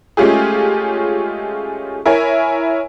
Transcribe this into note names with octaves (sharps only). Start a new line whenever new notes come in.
G#3 A3 C#4 F4 G4 G#4
E4 A#4 C#5 G#5